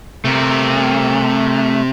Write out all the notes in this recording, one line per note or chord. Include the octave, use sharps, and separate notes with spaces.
C3 A3 A#4